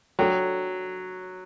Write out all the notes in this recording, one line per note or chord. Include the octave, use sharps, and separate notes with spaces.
F#3 D4 F#4 A4 D5 G5